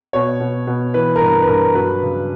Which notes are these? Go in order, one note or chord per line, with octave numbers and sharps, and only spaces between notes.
B2 C#5
B2
B2
E3 B4
A#4
G2 B4
B4
G2 A#4
F#3 B4
C#3